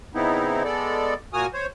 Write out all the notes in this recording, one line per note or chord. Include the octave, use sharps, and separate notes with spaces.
C#3 B3 C4 D#4 E4
G#3 B3 A4 D5
A#2 A#3 F#4 G#5 D#6 F6
C5 C#5